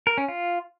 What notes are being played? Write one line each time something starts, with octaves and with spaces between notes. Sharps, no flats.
A#4
C#4
F4